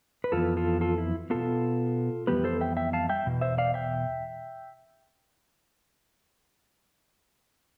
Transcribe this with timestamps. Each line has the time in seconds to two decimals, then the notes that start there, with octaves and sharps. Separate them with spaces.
0.24 B4
0.32 F2 E3 B3 F4 A4
0.57 F4 A4
0.81 F4 A4
0.98 E4
1.30 B2 B3 F4 A4
2.27 F2 E3 G3 B3 G4 B4
2.44 A4 C5
2.61 E5 G5
2.77 E5 G5
2.93 F5 A5
3.09 E5 G5
3.26 E2 B2
3.41 C5 E5
3.58 D5 F5
3.74 E5 G5